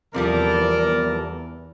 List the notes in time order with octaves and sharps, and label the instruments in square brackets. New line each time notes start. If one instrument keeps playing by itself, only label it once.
[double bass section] E2 [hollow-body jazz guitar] C3 F3 G3 [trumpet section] A4 A#4 D5